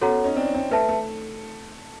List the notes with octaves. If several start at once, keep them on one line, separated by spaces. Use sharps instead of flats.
B3 C#4 F#4 A4 C#5 F#5 A#5
C#4 D#4
C4 D4
C4 D4
A3 B4 E5 A5
A3